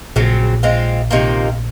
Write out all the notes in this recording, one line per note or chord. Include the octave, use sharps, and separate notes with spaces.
A#1 A#2 C#3 F#3 C4
G#3 C4 F4
C3 D#3 A#3 F4